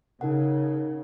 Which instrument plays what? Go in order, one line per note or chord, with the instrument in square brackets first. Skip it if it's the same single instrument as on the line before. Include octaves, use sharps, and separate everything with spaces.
[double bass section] C#3 [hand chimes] D#4 A#4 F#5